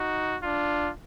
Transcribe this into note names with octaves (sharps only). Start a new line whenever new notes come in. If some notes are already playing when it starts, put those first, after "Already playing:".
Already playing: D#4 F#4
D4 F4